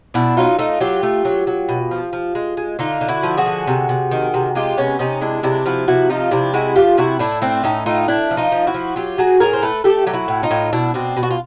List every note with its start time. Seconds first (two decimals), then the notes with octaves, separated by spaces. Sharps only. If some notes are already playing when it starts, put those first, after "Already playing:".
0.14 B2 D4 E4
0.37 F#3 D#4 F4
0.59 A3 D#4 F4
0.80 F#3 F4 G4
1.03 A3
1.25 F#3
1.47 F#3
1.69 B2
1.91 F3
2.13 F3
2.35 G#3
2.57 G#3
2.79 D3 D#4 F4
3.01 D3
3.08 E4 F#4
3.23 F3
3.37 F#4 G#4
3.46 D3
3.67 C3
3.89 C3
4.11 D#3
4.34 C3
4.55 G#3 F4 G4
4.77 C3 B3 C#4
4.99 C3 C#4 D#4
5.21 G#3 D4 E4
5.43 C3 D4 E4
5.66 F3 E4 F#4
5.88 C3 E4 F#4
6.10 F3 D#4 F4
6.31 C3 D4 E4
6.54 G#3 E4 F#4
6.76 F3 F4 G4
6.98 C3 E4 F#4
7.19 A2 D4 E4
7.42 A3 C4 D4
7.64 A2 C#4 D#4
7.86 A3 D#4 F4
8.08 A3 D4 E4
8.31 F3
8.37 D#4 F4
8.52 F3
8.67 E4 F#4
8.74 F3
8.96 F#3 F4 G4
9.18 F#3 F#4 G#4
9.40 A2 G#4 A#4
9.53 C5
9.62 A3 A4 B4
9.84 A3 G4 A4
10.06 F#3 G4
10.13 E4 F#4
10.28 A2
10.43 D#4 F4
10.51 A2
10.73 B2 D4 E4
10.94 B2 C4 D4
11.17 B2
11.23 F#4
11.31 F4